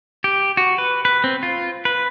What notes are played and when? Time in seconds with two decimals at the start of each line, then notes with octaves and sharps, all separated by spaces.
0.24 G4
0.57 F#4
0.78 B4
1.05 B4
1.24 C4
1.43 F4
1.85 B4